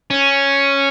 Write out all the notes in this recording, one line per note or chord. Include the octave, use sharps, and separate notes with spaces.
C#4